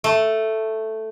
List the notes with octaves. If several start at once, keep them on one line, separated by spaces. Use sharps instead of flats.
A3